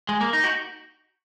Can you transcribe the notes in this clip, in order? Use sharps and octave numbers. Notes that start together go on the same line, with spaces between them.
G#3
A#3
D#4
F#4